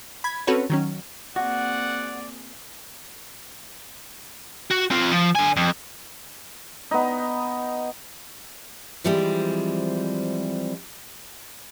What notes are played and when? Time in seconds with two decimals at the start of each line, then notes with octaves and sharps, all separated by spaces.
0.24 B5 G#6
0.47 C4 C#4 F#4 A4 B4 C#5
0.70 D#3 F#3 C#4
1.36 A#3 C4 F#4 G#4 D5 F#5
4.71 F#4
4.91 C4 F4
5.11 F3
5.35 D3 G#5
5.56 F2
6.91 B3 D#4
9.04 E3 F3 G3 G#3 C4